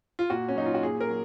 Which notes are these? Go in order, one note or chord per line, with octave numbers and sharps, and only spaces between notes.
F4
A#2 F#4
C#4
F#3 D#4
F4
F#4
A#2 G#4
A#4
F#3